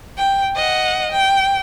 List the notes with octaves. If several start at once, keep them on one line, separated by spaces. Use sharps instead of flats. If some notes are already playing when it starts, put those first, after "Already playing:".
G5
D#5 F#5
G5